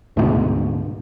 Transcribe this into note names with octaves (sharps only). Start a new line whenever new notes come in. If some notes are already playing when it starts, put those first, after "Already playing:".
D2 G#2 B2